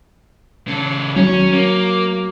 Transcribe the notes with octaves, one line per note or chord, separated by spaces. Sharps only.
C#3 A4
F#3 C#4
A#3